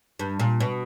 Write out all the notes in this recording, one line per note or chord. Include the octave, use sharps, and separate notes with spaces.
G2
A#2
B2